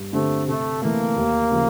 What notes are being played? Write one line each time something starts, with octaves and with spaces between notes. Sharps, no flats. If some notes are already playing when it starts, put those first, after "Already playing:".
Already playing: G2
D3 G3 A3 C4
C3 A3
E3 A3 A#3
D#2
C#3 F3